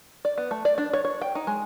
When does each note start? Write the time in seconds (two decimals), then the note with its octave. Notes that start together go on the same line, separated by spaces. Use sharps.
0.25 D5
0.38 B3
0.51 A3
0.65 D5
0.78 D4
0.93 C#5
1.05 C#5
1.22 G5
1.35 D#4
1.47 G#3